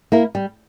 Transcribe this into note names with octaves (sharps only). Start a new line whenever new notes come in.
A#3 E4 A#4
G3